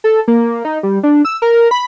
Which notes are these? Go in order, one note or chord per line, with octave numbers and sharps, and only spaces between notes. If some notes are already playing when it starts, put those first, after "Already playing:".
A4
A#3
D#4
G3
D4
E6
A#4
B5